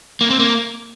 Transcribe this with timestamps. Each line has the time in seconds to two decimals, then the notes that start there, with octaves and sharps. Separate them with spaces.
0.21 A#3
0.30 C4
0.39 A#3